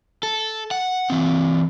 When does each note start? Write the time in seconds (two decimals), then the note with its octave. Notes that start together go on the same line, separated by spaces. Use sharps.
0.23 A4
0.71 F#5
1.10 E3 C4